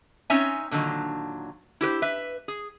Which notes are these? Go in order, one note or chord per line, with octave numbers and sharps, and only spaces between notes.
C4 C#4 D#4 C#5 E5 G#5
A#2 D3 D#3 F#3
E4 G4 B4 C5
B4 E5
G#4